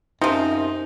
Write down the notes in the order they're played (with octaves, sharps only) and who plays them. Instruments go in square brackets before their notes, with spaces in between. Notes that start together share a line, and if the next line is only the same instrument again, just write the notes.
[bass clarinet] F#2 [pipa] C3 F3 [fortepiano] D#4